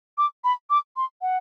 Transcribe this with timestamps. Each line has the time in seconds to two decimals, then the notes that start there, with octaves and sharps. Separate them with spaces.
0.18 D6
0.44 B5
0.70 D6
0.97 C6
1.22 F#5